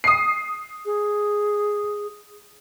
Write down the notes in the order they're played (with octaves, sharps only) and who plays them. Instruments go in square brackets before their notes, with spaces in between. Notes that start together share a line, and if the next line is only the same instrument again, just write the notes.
[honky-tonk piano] D#6 C7
[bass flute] G#4